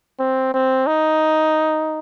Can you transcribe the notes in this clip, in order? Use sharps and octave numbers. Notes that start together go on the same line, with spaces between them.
C4
C4
D#4